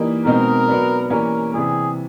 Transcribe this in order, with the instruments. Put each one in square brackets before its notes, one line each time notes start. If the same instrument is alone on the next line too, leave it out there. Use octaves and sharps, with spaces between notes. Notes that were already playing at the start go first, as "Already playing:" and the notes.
Already playing: [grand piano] E3 G3 A#3 D#4
[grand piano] B2 G#3 C4 D#4 [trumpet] A#4
[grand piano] F#3 B3 D4
[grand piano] E3 G3 A#3 C#4 [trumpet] A#4
[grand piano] C3 E3 G3 [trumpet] G#4